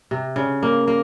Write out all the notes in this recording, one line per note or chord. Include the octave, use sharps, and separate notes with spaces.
C3
C#3
A#3
A#3